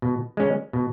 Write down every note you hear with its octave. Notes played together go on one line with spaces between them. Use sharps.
B2
G#3 C#4
B2